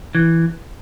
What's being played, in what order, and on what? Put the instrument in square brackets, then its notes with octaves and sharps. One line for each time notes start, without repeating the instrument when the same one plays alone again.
[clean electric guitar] E3